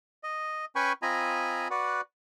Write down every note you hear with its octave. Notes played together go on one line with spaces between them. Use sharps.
D#5
C#4 B4 G5 G#5 B5 C#6
C4 F4 D#5 G#5 A#5 B5
F#4 B4 D5 F#5